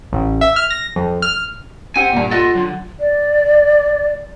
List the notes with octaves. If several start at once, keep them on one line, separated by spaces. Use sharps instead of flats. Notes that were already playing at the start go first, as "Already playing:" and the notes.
A1
E5
F6
A#6
F2
F6
C4 G4 F#5 G#5
G2 A#2
F4 A4 D#5 F#5
D3 F#3
D5